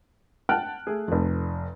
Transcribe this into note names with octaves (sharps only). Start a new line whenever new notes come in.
F#5 G5 A5 F6 F#6 D7
A3 G#4
F1 F2